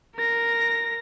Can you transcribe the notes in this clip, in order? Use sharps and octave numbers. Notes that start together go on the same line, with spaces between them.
A#4 A#6